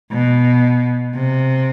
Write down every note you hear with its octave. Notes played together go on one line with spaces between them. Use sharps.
B2
C3